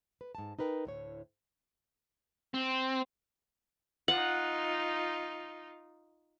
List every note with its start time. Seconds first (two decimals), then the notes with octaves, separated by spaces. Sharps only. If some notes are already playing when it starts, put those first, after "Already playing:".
0.21 B4
0.35 G#2 A5
0.59 D#4 A#4 B4 G5
0.85 D2 A2 C#5
2.54 C4
4.08 D#4 F4 F#5